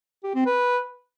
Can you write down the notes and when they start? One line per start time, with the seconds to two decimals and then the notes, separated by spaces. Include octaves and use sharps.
0.24 G4
0.35 C4
0.46 B4